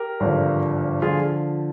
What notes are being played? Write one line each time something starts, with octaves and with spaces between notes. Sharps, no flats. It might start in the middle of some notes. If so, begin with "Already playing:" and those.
Already playing: G4 A#4
G#1 G2 D3 F3
D3 F3 F4 G#4